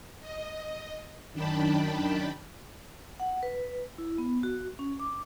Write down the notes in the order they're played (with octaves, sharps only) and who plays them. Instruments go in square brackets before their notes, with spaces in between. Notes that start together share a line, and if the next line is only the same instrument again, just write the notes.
[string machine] D#5
F#2 D#3 D4 G5 A5 B5
[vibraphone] F#5
B4
E4
B3
F#4
C#4
D6